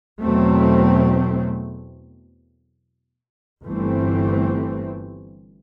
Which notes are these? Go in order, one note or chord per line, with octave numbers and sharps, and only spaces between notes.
E2 B2 F#3 A3 C4
G1 G2 E3 A3 C4